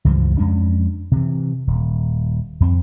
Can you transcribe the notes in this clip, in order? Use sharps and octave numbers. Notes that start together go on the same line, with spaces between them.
C#2 G2 E3 F3
F2 G#3 C#4 D4
C3 E3
D#1
F2 C4